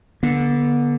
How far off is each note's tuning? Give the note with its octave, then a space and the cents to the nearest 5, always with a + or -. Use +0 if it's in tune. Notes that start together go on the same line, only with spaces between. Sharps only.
D3 -15 B3 -35